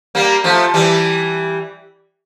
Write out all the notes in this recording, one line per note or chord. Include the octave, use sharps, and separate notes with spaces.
G3 A#3
F3 A3
E3 G3